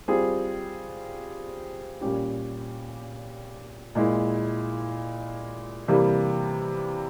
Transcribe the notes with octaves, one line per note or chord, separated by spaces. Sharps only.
G3 C4 F4 G#4
A#2 G3 C#4 G4
A#2 G#3 E4
C3 E3 G3 A#3